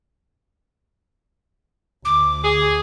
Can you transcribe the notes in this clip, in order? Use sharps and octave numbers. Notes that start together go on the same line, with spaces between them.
D2 D6
G#4